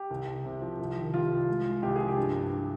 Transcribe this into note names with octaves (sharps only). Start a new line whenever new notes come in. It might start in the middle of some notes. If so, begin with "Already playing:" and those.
Already playing: G4
C2
C2
C3
F3
C2
D#3
G3 F4
C2
G#3
G#3
C2 G4
F3 G#4
G4
G2
G2